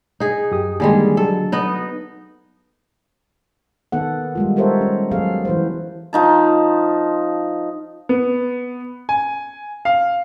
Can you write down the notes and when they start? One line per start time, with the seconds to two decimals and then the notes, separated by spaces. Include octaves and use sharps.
0.20 D#4 G#4
0.51 F#2 G4 D#6
0.80 D3 D#3 G3 G#3 A#3 G#5
1.17 F#3 A4
1.52 B3 D#4 D#5
3.92 D#3 B3 A4 F#5
4.35 G3 G#3 F4
4.56 G4 A4 A#4 C5 C#5 E5
4.81 C#4
5.11 F#3 B3 G#4 A4 F5
5.45 E3 B4 C5
6.13 F3 D#4 A5
8.09 B3
9.09 G#5
9.85 F5